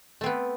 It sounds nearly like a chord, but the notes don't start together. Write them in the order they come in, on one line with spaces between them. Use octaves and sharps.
A3 C4 B3